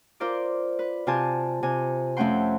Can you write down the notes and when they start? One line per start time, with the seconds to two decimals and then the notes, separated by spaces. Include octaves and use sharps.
0.20 F4 A#4 C5 D5 D6
0.79 B4
1.07 C3 F4 G4 G#5 A5
1.63 C3 G#5
2.17 F2 A3 C#4 F#5 G5 C6